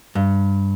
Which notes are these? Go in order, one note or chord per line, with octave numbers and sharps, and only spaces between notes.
G2